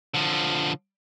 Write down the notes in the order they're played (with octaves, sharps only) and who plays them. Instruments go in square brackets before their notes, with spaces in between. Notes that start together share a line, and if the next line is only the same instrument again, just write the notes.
[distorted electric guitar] D3 F3